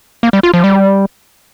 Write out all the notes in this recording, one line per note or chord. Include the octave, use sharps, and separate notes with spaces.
A#3
G3
F4
F3
G3